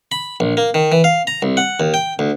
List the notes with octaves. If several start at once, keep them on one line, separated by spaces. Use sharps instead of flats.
B5
A#1
A#3
D#3
E3
F5
A#5
C2
F#5
D#2
G5
D2